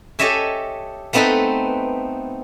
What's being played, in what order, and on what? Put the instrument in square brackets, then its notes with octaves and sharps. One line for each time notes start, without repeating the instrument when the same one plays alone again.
[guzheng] G4 A4 C#5 D#5 E5 G#5
A3 B3 C4 D#4 A4 B4